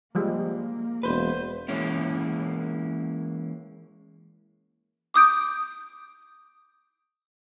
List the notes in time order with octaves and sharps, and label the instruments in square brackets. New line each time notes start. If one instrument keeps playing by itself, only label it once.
[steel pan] F3 G3 G#3 [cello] A#3
[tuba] E1 [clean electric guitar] B4 C5
[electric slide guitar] E3 G#3 A#3 C#4 E4
[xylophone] D6 D#6 G6 D7